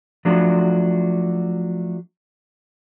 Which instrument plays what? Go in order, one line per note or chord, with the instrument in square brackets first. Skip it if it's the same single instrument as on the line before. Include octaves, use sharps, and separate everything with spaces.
[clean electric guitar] F3 F#3 A3 D4 F#4